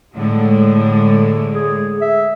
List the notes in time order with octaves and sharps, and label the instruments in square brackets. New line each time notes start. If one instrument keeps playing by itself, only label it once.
[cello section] A2 D3 G#3
[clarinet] G#4
E5